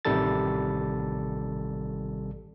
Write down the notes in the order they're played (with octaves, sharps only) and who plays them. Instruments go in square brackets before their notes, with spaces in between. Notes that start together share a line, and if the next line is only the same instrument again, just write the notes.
[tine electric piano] A1 C3 D#3 G3 A4 A6